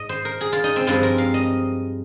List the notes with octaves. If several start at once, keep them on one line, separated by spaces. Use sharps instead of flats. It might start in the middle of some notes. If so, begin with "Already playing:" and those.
Already playing: G#2 D#5
C5
A#4
G#4
F4
D#4
C4
G2 F3 G#3 F4
A#4
F5
D#5